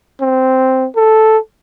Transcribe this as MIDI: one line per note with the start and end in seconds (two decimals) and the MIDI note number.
0.21 0.87 60
0.96 1.38 69